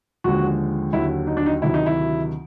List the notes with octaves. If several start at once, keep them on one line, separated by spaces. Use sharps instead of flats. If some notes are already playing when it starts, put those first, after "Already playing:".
D#2 D3 F3 G#3 F#4
D#2 D3 F#3 E4
D#4
D4
D#4
D2 C3 D#3 F#3 E4
D#4
E4